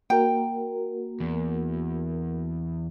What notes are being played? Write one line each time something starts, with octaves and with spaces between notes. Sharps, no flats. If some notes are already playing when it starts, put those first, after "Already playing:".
A#3 F#4 A#4 G5
E2